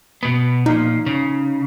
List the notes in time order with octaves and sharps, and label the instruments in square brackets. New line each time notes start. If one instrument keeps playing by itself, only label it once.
[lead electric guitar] B2 B3
[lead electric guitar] A#2 F3 [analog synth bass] D#4
[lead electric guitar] C#3